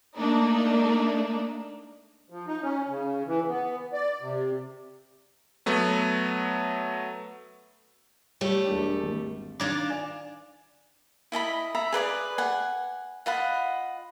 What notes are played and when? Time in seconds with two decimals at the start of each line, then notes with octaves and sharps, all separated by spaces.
0.18 A3 A#3 D4 D#4
2.30 F3
2.46 D#4
2.62 C#4
2.88 C#3
3.26 E3
3.48 B3
3.93 D5
4.21 C3
5.66 F#3 A3 B3
8.41 G3 A3 G4 C#5
8.67 E1 D4
9.03 G#1
9.60 D#3 D4 F4 D6 G#6 A6
9.90 D5 F5 G#5
11.32 E4 D#5 A5 B5
11.75 E5 A#5 B5
11.92 G#4 B4 D5 D#6
12.38 F#5 G#5
13.26 F4 D#5 F#5 B5